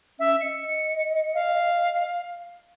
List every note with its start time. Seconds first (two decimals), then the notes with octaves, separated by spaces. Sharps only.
0.19 C#4 E5
0.41 D#5 C#7
1.34 F5